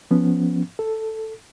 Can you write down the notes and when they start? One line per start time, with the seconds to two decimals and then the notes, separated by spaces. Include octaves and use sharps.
0.11 F3 B3 C#4
0.79 A4